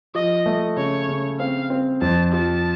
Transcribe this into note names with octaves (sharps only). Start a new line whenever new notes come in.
F3 D#5
A3
C#3 C#5
C#3
C4 F5
C4
F2 A5
F3 A5